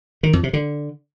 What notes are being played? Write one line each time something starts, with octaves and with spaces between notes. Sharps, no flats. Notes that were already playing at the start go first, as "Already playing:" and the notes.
D#3
F2
C3
D3